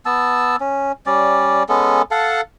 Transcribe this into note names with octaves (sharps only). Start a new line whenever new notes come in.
B3 A5 E6
C#4
G3 C#4 D5
G#3 B3 C#4 A4
A4 F5 F#5 A5